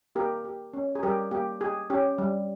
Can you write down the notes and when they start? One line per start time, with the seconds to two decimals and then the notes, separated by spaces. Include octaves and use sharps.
0.15 A#3 G4 A#4
0.44 G4
0.74 C#4
0.95 G#4
1.03 G3 G4 A#4
1.31 A#3 G4
1.60 G4 G#4
1.90 C#4 G4
2.18 G3